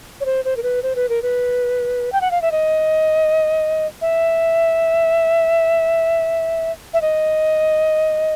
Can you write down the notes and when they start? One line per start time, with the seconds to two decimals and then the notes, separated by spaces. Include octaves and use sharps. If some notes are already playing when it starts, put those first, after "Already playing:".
0.21 C#5
0.26 C5
0.45 C5
0.57 A#4
0.63 B4
0.83 C5
0.96 B4
1.09 A#4
1.22 B4
2.12 G5
2.21 F#5
2.31 F5
2.42 E5
2.52 D#5
4.01 E5
6.94 E5
7.02 D#5